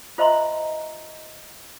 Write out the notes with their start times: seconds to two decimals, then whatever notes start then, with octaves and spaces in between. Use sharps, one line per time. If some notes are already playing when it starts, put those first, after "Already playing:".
0.18 F4 C5 D#5 E5 A#5 C6